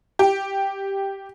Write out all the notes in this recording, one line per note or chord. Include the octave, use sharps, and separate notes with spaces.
G4